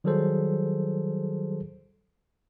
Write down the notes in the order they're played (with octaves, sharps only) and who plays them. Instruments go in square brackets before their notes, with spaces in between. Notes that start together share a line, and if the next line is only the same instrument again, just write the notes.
[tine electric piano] D#3 F#3 G3 G#4 A4 C5